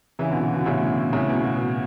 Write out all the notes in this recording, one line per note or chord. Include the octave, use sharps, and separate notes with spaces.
C#3 E3
B2 D3
B2
B2
D3
A2 C#3
A2 C#3
B2
B2